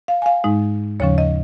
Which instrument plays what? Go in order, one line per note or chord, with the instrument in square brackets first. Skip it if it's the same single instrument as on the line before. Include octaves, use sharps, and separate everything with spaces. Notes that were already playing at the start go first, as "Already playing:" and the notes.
[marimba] F5
G#5
F5
G#2 G#3 D#4
D#2 C#3 F3 C#4 C#5
D#5